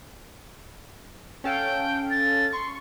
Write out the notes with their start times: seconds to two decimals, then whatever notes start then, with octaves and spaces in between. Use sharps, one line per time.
1.44 C#4 A4 F5 G5
2.10 A6
2.53 C6 C#6